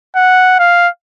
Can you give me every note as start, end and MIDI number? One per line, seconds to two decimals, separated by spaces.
0.16 0.58 78
0.59 0.89 77